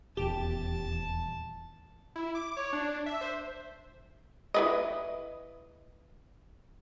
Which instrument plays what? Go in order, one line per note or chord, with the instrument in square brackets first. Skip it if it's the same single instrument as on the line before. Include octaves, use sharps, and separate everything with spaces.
[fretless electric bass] D#1 E2 [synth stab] G4 [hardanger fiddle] A5
[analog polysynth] E4
D6
C#5
D4
E5
C5
[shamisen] E4 B4 D#5